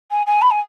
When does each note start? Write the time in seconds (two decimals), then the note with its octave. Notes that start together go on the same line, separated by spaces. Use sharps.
0.11 G#5
0.26 G#5
0.41 B5
0.51 G#5